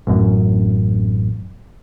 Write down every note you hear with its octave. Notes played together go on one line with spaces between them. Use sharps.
A1 F#2